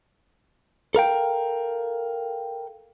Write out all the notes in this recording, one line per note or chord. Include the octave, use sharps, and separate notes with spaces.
A4 A#4 F5 G5